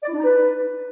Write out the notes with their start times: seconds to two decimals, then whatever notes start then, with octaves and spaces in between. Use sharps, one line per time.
0.03 D5
0.09 E4
0.14 D4
0.19 D#4
0.24 B4